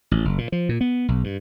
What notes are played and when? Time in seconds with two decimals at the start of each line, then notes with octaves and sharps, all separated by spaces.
0.11 A1
0.25 F#1
0.38 A#2
0.52 F3
0.69 A#2
0.81 B3
1.08 B1
1.24 G2